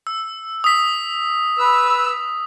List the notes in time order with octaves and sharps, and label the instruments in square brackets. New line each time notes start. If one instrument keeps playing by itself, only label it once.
[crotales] E6
D#6 B6
[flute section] B4 E6